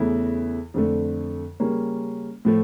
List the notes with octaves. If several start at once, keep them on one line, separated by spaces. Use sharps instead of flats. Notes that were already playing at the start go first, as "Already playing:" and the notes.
Already playing: E2 C#3 E3 A3 E4
F2 D3 A3
C#3 G3 A#3 C#4
A2 F3 A3